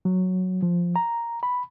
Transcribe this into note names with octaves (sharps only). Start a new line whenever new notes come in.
F#3
F3
A#5
B5